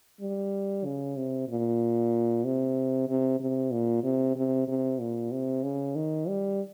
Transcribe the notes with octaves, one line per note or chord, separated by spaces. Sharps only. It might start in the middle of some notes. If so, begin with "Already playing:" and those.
G3
C#3
C3
A#2
C3
C3
C3
A#2
C3
C3
C3
A#2
C3
C#3
D#3
G3